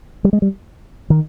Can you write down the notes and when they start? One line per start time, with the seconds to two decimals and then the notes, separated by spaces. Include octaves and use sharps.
0.24 G3
0.33 G#3
0.42 G3
1.10 D#3